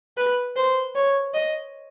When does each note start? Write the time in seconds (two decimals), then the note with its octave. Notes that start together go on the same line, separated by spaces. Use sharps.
0.17 B4
0.56 C5
0.96 C#5
1.34 D#5